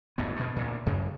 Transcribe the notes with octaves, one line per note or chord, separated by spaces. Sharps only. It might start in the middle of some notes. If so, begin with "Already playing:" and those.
D1 G1 G#2 B3
G2 B2
D2 A#2
F#2 C#3